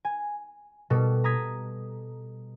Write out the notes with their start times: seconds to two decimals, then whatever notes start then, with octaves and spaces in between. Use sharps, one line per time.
0.05 G#5
0.90 B2 G3 A4
1.24 A#5 D#6 G#6 B6